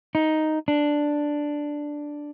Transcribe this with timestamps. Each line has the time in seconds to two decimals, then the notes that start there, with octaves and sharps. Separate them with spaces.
0.15 D#4
0.68 D4